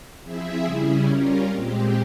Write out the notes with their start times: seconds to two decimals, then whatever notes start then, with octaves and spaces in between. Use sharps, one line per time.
0.23 F3 C4 E4 G#4 E5
0.64 C#3 G3 C#4 E4 G#4
1.07 G3 C#4 F4 A#4
1.48 A#2 G#3 C4 G4